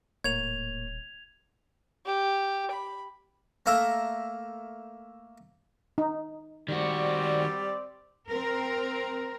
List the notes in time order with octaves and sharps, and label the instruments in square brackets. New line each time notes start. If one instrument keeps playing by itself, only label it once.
[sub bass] D#1 [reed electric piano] A2 A#3 C#5 [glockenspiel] G#6 F7
[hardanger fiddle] G4
B5
[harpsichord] A3 A#3 A4 A#4 E5 A#5
[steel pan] D#4
[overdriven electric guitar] D#3 F#4 [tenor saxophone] G3 [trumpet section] C4 D5
[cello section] C4 A#4